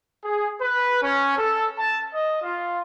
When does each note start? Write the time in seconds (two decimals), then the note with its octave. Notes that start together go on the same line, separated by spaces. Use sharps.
0.24 G#4
0.61 B4
1.01 C#4
1.38 A4
1.78 A5
2.14 D#5
2.43 F4